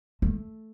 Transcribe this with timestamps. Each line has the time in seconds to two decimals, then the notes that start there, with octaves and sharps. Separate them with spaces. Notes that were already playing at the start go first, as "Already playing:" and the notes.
0.22 A3